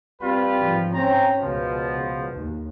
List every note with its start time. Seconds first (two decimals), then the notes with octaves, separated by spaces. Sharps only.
0.21 G3 C4 F4 B4
0.58 G#2 F3
0.95 C4 C#4 A#5
1.42 C#2 B2 F3
2.35 D#2